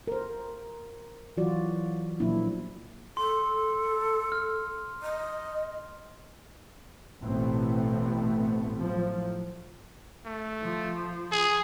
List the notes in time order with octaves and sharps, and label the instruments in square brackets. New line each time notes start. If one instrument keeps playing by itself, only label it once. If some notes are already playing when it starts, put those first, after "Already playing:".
[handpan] A#4 C5
E3 F#3 F4 F#4 D5
A#2 F3 F#3 A#3 D4 E4
[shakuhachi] A4 [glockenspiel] C6
[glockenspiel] F6
[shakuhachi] D#5
[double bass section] A1 B2 A3 B3 C4
A2 F3 F#3
[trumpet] A3
[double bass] F3
[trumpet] G#4